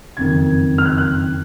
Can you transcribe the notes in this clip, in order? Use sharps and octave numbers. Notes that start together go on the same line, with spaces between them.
F#1 F2 D#3 G#6
F6
F#6
F#6